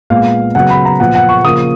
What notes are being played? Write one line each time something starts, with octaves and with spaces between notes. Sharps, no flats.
A#2 G#3 B3 F5
C#3 F#3 B3 F#5
B5
A#5
A#2 F3 B3 F#5
F#5
C#6
C#3 F3 A#3 D#6